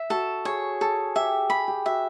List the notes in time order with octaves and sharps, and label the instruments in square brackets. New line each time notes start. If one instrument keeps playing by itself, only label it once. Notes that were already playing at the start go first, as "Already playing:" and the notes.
Already playing: [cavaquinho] E5
[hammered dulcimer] F#4 [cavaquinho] A4
[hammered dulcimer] G#4 [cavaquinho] C#5
[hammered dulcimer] G#4 [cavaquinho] A4
[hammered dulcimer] G4 [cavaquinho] E5
[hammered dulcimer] G#4 [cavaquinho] B5
[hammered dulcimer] G4
[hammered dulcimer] F#4 [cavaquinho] E5